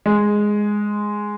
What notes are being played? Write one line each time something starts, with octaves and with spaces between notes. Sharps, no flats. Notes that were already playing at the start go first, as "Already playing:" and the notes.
G#3